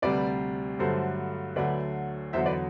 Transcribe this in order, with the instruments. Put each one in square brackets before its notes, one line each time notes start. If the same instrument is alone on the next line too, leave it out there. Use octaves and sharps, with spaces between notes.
[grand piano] D2 C3 G3 B4 D5
G2 D3 F#3 A3 A4 C5
D2 D3 F#3 A3 B4 D5
E2 D3 F#3 C5 E5
B4 D5